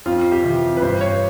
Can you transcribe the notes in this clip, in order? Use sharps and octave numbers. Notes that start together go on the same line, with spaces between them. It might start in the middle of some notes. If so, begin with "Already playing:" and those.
F2 F4
G4
C3 E3
B4
G2 C5
C#5